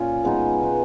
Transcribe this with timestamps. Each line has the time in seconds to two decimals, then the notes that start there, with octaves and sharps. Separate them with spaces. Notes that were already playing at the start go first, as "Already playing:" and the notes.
Already playing: A#2 C#4 F4
0.23 B2 G#3 B3 D#4
0.61 B2 G#3 B3 D#4